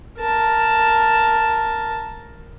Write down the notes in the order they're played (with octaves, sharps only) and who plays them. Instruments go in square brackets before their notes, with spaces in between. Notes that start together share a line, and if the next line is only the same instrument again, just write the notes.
[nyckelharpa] A#4 A5